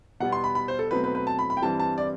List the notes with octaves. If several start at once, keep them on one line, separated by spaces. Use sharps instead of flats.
B2 G3 B3 F#5
C6
B5
B5
C5
A4
B2 F#3 A3 C4 B4
B4
B4
A5
B5
B5
G5
G2 E3 G3 C4 A5
A5
D5